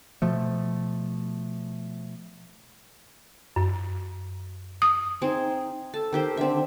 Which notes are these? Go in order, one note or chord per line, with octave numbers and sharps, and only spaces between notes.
B2 F3 A3
F#2
D#6
C4 D#4 G#4
A4 A5
D#3 G4 C5
D3 C4 E5